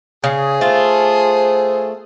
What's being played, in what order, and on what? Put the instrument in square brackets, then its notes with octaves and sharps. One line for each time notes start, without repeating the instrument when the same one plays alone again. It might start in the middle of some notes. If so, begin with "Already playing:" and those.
[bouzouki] C#3 [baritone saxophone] G#4
[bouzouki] A3 F4 [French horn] C5